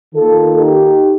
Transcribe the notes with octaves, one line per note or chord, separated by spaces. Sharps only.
D#3 A#3 F4 A4
D#4 G4